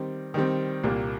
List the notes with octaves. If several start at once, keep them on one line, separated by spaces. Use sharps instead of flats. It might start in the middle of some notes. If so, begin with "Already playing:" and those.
Already playing: D#3 G3 C4
D#3 G3 C4
C2 A#2 G3 A#3